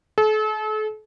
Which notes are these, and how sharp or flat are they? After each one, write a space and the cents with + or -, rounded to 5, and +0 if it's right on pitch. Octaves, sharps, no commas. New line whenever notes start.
A4 -40